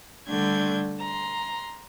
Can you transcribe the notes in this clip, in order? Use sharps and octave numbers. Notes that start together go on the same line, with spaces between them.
D3 G3 A3 D4 G6 G#6
A#5 C6